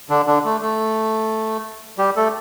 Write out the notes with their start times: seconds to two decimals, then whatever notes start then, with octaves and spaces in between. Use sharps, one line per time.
0.10 D3 D4
0.27 D3 D4
0.45 A3
0.61 A3
1.98 G3 G4
2.16 A3 A4